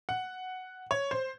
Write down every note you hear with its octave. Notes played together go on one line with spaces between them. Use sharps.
F#5
C#5
C5